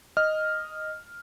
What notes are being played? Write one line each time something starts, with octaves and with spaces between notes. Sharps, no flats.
D#5 F6